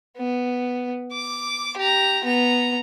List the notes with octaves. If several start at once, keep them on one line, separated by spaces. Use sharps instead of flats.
B3
D6
G4 A#5
B3 A#5